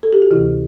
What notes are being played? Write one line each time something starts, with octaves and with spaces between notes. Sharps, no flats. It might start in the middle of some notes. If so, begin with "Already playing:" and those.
A4
G4
F#4
D2 C3 E3 E4